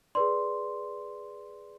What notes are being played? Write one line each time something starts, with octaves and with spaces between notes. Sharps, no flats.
G#4 B4 D5 C6